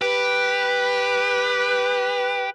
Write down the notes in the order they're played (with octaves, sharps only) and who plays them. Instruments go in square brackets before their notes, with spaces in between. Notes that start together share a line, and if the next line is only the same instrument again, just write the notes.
[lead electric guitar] G4 [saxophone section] B4